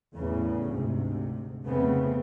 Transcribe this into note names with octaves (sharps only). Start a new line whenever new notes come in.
E2 A2 C#3
D2 G#2 C3
F1 C#3 A3 B3 C4